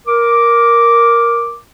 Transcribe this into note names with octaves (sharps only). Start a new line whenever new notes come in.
A#4 D6